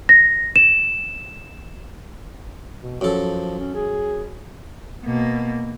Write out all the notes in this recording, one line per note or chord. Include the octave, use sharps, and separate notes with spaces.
A#6
E7
B2
F#2 F3 A4
C#4
G#4
B2 A#3